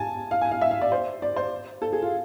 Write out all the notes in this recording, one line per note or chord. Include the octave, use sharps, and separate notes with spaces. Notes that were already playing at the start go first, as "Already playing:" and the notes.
Already playing: G#5 A5
F5
G#5
F5
E5
F5
D5
C5
D5
C5
A4
G#4
F4